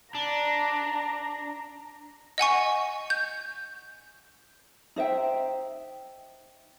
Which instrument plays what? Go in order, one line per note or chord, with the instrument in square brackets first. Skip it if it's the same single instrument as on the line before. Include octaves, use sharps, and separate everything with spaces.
[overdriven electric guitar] D4 [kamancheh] A#5
[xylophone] D#5 F#5 G#5 C#6
G6
[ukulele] D#4 C5 E5 G5